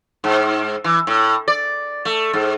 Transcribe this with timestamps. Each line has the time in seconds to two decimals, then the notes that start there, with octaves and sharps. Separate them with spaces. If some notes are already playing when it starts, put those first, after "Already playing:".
0.24 G#2
0.84 E3
1.07 A2
1.48 D5
2.05 A3
2.33 G#2